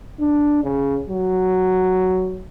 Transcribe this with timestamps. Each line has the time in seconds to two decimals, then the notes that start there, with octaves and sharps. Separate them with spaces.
0.20 D4
0.64 C#3
1.10 F#3